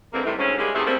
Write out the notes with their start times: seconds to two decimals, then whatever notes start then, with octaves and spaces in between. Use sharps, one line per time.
0.14 D3 E3 G#3 A#3 C4
0.25 A2 C3 D#3 E3 G3 A3
0.39 D2 G#2 G#3 C4 C#4
0.59 G3 G#3 A#3 G4 G#4
0.74 E2 C3 A3 B3 G#4
0.87 G3 A3 A#3 C4